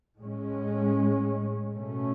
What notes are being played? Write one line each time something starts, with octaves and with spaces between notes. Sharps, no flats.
A2 G#3 C#4
B2 A3 C#4